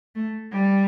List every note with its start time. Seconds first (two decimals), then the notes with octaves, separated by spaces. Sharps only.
0.16 A3
0.52 G3